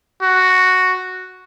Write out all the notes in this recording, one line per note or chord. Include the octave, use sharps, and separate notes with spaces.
F#4